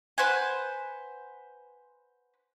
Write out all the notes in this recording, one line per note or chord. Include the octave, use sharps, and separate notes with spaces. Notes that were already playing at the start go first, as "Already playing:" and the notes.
B4 C5 F#5 G#5